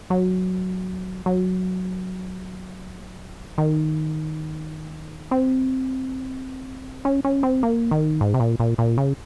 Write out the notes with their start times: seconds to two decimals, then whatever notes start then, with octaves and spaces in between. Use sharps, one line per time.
0.10 F#3
1.26 F#3
3.58 D#3
5.31 C4
7.05 C#4
7.25 C#4
7.43 C4
7.63 A#3
7.91 D#3
8.21 G#2
8.34 C3
8.40 A#2
8.60 A#2
8.78 A#2
8.98 C#3